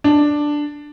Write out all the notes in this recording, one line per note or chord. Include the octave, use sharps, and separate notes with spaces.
D4